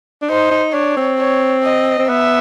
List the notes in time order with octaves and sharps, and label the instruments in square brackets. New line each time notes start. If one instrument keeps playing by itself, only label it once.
[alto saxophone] D4
[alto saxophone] D#4 [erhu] C5
[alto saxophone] D#4
[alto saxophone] D4 [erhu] C#5
[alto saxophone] C4
[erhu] C#5
D#5
[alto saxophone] C4
[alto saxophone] B3 [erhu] E5